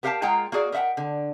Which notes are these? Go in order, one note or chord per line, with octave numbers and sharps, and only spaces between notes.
B3 G4 A#4 F5 G5 A5
G#3 A#3 F4 F#5 G5 A#5
A#3 F#4 G#4 D5
A#4 B4 E5 F#5 G5
D3